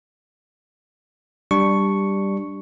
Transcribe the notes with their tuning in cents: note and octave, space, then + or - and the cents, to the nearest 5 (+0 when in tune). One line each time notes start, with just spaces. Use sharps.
G3 +0 D4 +0 C#6 +0